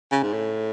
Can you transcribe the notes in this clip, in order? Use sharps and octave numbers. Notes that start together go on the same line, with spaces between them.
C#3
G#2
A2